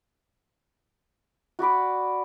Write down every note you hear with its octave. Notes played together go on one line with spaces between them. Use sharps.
F#4 D5 B5 D6